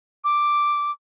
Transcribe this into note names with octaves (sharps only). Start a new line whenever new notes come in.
D6